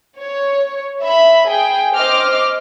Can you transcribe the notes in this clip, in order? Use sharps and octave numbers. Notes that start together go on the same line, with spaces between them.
C#5
E5 B5
G#4 G5
C5 D#5 D6 F6